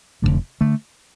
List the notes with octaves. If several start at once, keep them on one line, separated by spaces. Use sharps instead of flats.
F1 D#2 D3 A3
D3 A3